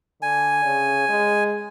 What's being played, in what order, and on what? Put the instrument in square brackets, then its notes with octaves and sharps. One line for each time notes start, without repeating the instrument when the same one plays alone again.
[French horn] D3 [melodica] G#5
[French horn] C#3
G#3